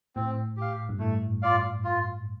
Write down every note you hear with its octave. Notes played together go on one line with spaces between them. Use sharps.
A2 C4
G4 F5
G2
A2 A3
F4 D5 F5
F4